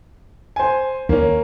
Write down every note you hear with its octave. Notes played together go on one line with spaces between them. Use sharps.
C5 G#5
D#2 A#3 C#4